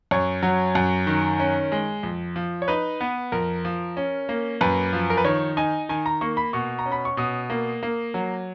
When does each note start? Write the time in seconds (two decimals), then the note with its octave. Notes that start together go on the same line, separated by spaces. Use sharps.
0.11 F#2 C#5
0.43 F#3
0.75 F#2
1.07 D#3
1.40 C#4
1.72 G#3
2.03 F2
2.36 F3
2.62 C#5
2.68 D#4 B4
3.01 B3
3.32 F2 A#4
3.65 F3
3.97 C#4
4.29 A#3
4.61 F#2 B4
4.93 F3
5.10 A#4
5.17 B4
5.24 D#3 C#5
5.57 D#4 G#5
5.89 D#3 G#5
6.06 A#5
6.21 A#3 C#6
6.37 B5
6.53 B2 C#6
6.79 A#5
6.86 C#4
6.92 B5
7.05 C#6
7.17 B2 D#6
7.50 A#3
7.83 A#3
8.14 F#3